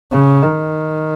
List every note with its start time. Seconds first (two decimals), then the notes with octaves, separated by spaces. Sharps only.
0.13 C#3
0.42 D#3